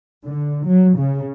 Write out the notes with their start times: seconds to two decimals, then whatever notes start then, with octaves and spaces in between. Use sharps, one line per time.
0.24 D3
0.65 F#3
0.97 C#3